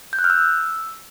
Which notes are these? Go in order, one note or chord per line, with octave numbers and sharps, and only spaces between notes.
G6
F#6
F6
E6